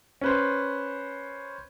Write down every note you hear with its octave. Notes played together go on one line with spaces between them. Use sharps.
C#4 B4 C5